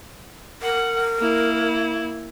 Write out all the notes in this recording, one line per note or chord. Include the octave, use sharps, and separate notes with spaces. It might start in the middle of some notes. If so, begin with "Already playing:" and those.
A#4 F#5
A#3 E4